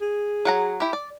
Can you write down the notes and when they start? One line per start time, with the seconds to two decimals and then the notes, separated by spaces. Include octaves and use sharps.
0.01 G#4
0.45 F#3 F#5 A#5
0.80 E4 G4
0.93 D5